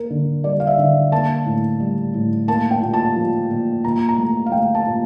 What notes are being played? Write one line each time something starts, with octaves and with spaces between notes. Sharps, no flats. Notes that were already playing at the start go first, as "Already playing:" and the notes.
Already playing: A#3 A#4
D3
G3 D5
F5
E5
D3
A#3 A5
A2
G3
A2
A#3 A5
G5
A#2
A5
F3
A#2
A#2 A#5
A#5
A3
F5
A3 G5
A5
A#2